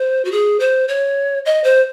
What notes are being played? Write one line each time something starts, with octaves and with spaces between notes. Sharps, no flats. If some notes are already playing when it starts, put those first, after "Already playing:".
Already playing: C5
F#4
G#4
C5
C#5
D#5
C5